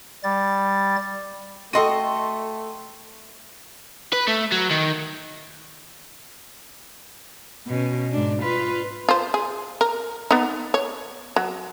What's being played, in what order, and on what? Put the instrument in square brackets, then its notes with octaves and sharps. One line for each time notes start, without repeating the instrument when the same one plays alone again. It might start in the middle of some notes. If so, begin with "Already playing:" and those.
[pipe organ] G3 A6
[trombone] A3 [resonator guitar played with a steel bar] F#4 D#5 G5 [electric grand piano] A4 C6 D#7
[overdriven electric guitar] B4
A3
F#3
D#3
[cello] B2 C#4
G#2 D4
F4 B4
[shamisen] F4 C5
G#4
A#4
B3 D#4
C#5
F#3